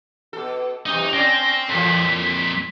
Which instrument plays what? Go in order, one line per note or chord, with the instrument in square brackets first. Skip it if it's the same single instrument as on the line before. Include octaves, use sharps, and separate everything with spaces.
[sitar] B2 A4
[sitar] F#2 C3 E3 [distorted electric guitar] D#4
[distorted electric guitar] C4 G5 [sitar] C#4 D5 [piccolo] A#6
[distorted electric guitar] F2 A#2 [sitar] E3 A4 [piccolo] B6